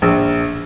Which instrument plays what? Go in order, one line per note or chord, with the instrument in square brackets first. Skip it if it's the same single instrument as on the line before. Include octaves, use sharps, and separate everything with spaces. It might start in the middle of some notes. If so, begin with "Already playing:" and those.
[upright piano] A#1